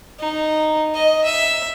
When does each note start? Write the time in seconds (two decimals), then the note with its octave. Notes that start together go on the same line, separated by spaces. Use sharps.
0.20 D#4
0.94 D#5
1.25 E5